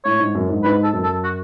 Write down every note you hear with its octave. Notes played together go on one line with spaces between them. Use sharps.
A2 C#5
G#2
F#2
G#2
G#2 B4
A4
F#2
A4
F#4